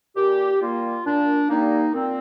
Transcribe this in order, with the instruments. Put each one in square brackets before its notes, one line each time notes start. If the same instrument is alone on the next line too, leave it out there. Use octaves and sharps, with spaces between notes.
[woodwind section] A#2 G4
G3 A#3 F4
A#2 D4
G3 A#3 D#4
A#2 C4